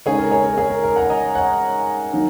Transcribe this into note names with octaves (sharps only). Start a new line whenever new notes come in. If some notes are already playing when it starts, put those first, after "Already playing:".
C#3 G#3 D#4 G#4 C#5
A#4
G#4 C#5
A#4
G#4
A#4
A#4
F#5 A#5
D#5 G#5
C#5 F#5
D#3 F#3 A#3 D#4